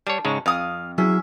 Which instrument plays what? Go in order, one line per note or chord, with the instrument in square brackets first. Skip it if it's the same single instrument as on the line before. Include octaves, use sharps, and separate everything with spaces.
[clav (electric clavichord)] G3 C#5 [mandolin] D4
[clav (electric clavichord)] G#2 C#3 G#3 [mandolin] C#6
[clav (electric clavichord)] F2 [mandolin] F5 D#6
[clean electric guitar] F#3 E4 G#4 [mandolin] C#4 E5